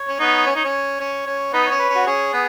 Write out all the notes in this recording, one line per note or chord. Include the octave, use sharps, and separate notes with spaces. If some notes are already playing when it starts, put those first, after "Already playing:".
Already playing: C#5
C#4
B3 D#4
C#4
D#4
C#4
C#4
C#4
B3 D#4 B4
C#4 C#5
B4
C#4
F#4
C#4 G#4
B3